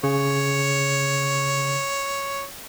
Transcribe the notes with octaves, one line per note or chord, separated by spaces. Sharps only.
C#3 C#5